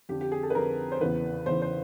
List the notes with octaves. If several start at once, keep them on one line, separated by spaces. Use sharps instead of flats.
F2 D3 G4
G4
G#4
A4
B4
F2 D3 A#4
C5
E2 C#3 E3 B4
E2 C#3 E3 C5
C5